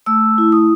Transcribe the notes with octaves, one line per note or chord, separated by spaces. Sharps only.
A3 E6
E4
D#6